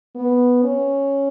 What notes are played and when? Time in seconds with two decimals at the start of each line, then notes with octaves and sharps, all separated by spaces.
0.15 B3
0.62 C#4